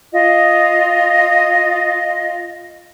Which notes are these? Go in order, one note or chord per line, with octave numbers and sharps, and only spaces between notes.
F4 D#5